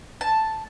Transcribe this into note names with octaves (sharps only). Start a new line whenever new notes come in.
A5